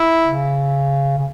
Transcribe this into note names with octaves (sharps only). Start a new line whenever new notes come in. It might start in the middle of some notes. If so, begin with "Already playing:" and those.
Already playing: E4
C#3
C#3